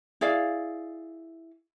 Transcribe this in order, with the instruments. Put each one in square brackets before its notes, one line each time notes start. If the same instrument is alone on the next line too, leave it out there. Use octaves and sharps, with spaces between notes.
[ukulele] E4 G#4 D5 F5